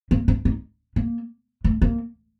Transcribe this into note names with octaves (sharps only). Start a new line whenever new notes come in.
A#3
D4
D#4
A#3
A3
A#3